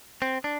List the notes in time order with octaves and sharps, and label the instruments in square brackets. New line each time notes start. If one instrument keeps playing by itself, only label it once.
[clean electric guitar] C4
D4